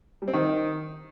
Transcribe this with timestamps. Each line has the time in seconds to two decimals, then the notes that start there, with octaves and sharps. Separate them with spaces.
0.22 G3
0.28 C4
0.33 D#3